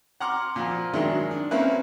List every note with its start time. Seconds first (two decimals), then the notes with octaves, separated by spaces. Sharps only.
0.20 F#5 A#5 C6 D6 F6
0.56 A#2 F3
0.94 D#3 F#3 G#3 D4 E4 A#4
1.31 D4
1.51 A#3 C4 C#4 E4 B4